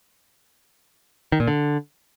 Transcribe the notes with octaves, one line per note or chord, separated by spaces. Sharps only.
D#3
A#2
D3